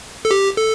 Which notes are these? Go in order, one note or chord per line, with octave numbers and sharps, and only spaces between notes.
A4
G4
A4